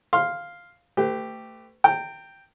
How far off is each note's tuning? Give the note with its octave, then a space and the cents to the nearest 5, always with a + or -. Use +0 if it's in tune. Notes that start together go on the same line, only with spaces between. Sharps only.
F5 +0 C6 +0
A3 +25 G4 +0 B4 +40
G5 +0 A#5 -40